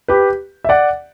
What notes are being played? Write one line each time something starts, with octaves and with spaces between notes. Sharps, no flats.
G4 B4
E5
D5 F#5